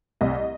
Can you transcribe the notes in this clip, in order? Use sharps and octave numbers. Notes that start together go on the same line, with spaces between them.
C2 D#5